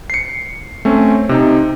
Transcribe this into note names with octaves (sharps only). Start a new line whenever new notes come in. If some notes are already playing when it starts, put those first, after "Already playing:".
C7 C#7
A3 C4 C#4
C3 D#4